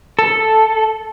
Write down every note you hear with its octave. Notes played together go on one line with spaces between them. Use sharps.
A4